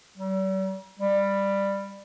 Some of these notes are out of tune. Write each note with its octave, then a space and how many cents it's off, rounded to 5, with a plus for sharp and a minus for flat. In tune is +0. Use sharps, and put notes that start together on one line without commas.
G3 -45
G3 +15